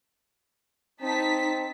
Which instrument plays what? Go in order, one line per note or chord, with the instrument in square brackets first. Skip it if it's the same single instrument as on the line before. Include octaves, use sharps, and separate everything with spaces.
[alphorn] C4 [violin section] D#4 A5 B6